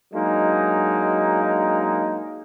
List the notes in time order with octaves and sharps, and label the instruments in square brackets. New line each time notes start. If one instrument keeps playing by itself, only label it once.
[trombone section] F#3 G#3 A#3 D4 D#4